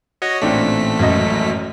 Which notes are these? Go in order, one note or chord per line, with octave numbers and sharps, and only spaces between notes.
F#4 C#5 D#5 A#6
A1 A#2 A3 C4 D4 B6
G#1 F#2 D#5